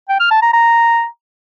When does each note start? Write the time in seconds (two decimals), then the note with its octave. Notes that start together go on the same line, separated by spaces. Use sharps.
0.09 G5
0.20 F6
0.31 A5
0.42 A#5
0.53 A#5